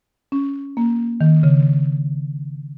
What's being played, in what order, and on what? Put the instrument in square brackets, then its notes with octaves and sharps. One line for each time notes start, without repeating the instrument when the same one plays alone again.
[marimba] C#4
A#3
D#3
C#3